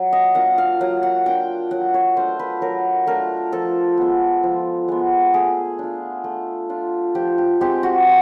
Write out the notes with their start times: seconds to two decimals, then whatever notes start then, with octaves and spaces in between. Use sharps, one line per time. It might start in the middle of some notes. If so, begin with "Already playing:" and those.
Already playing: F#3
0.13 D#5
0.35 A#3 D4 F4 F#5
0.58 F5
0.81 F#3 F#5
1.03 F#5
1.26 A#3 D4 F4 G5
1.71 F#3 F#5
1.94 C#5
2.17 A3 D4 F4 C5
2.39 B4
2.61 F#3 A#4
3.07 A3 D4 F4 A#4
3.52 F3 A4
3.98 G#3 B3
4.43 F3
4.88 G#3 B3
5.34 A3 G#4
5.79 D4 F4
6.24 A3
6.70 D4 F4
7.15 F3 G4
7.38 G4
7.61 G#3 C4 G4
7.83 F#4
8.06 F3